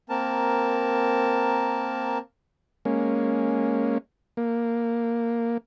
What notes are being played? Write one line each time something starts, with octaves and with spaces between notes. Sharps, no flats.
A#3 C4 A#4 A5
G#3 A#3 C#4
A#3